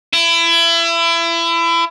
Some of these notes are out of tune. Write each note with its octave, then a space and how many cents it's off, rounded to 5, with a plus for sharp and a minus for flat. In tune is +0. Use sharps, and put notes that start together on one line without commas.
E4 +30